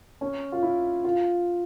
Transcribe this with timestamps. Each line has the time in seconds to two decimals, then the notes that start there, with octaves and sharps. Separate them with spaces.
0.21 C#4
0.52 F4
0.63 E4
1.04 F4